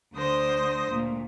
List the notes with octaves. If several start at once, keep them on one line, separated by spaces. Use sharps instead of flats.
D2 D3 C5 D#6 A#6
D2 A#2